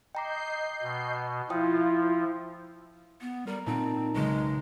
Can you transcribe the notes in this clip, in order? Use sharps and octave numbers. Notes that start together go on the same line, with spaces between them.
D#5 G5 A#5 D6 G6 C7
B2
F3 E4 F4 C5 G5 D#6
B3
G3 A#4
A#2 C4 D#4 A5
B1 C#3 G#3